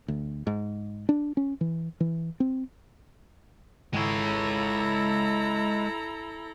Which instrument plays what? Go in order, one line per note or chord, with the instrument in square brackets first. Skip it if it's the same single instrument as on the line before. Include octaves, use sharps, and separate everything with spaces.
[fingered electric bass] D2
G#2
D4
C#4
E3
E3
C4
[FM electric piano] G#1 [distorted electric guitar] G#3 C#5 [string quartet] E4 A4 A#5